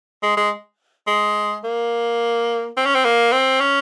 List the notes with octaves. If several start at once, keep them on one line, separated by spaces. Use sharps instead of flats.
G#3
G#3
G#3
A#3
C4
C#4
C4
A#3
C4
C#4